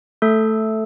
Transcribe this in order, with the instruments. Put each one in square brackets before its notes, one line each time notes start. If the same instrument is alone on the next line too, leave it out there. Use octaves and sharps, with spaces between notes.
[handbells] A3 A4